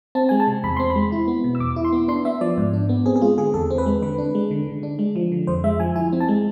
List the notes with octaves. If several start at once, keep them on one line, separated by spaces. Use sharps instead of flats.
C4 A5
G#3 G#5
A5
C3
E2 B5
C4 C6
B5
G#3
E4
B3
B2
E6
E2 D6
E4
C6
B3
D4 C6
B3 E5
F3 D5
G#2
D4
B3
C4 G#4
G#4
G#3 F4
D3 G#4
E2 A4
C4
B4
G#3
D3 B4
D4
G#3
D3
D3
D4
G#3
F3
D3
F2 C5
G#3 E5
F3 G#5
E4 G#5
C4
A5
G#3